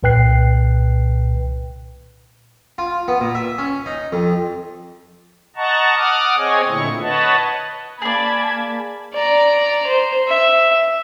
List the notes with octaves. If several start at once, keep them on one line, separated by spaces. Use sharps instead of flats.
C2 A#2 B4 G5 F#6 C7
F4
B3
A#2
E5
C#4
D#4
F2
D#5 F#5 A5 A#5 C#6
F#5 D6 D#6 F6
C4 G#4 C#5 D#5 G#5
A#2 D3 A3 E4 C#6
B4 C#5 D#5 F#5 A5
A#3 G#4 D5 A5 B5 G#6
D5 A#5
C5
E5